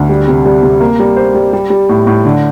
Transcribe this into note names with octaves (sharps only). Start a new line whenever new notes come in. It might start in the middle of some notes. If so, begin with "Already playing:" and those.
Already playing: D2
G3
C3
G3
C3
A#3
G3
C5
G3
G3
G3
A2
A2
D3